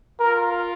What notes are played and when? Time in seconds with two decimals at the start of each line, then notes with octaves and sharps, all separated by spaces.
0.19 F4 A#4